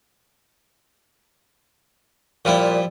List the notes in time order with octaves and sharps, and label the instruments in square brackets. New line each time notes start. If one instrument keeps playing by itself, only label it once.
[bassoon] A#2 [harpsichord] F3 G3 E4